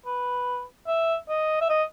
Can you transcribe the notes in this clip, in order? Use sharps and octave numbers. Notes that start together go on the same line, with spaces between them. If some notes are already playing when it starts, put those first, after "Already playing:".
B4
E5
D#5
E5
D#5